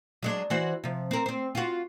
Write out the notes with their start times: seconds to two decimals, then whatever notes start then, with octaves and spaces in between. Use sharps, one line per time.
0.22 F#3 G#3 D4
0.50 E3 F#4 C5
0.84 C3 F3
1.11 C4 A#4
1.26 C4 C5
1.55 F4 F#4